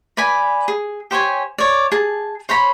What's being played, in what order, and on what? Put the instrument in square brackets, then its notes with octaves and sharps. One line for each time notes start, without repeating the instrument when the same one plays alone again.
[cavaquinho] B4 D5 G#5 B5
G#4
G4 C5 C#5 G#5
C#5 D5
G#4 A5
C5 C#5 A#5 B5